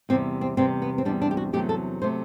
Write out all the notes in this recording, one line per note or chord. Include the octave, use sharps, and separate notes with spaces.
E2 C3 G3 C4
C4
E2 C3 G3 C4
B3
C4
E2 C3 G3 D4
D4
G4
F#4
E2 C3 F#3 A3 G4
A4
C3 F#3 A3 C5